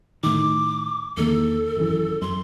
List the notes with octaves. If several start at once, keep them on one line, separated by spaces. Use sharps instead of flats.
A2 D#3 D6
E2 D#3 A#3 A4
G#1 F#2 E3
F#2 C6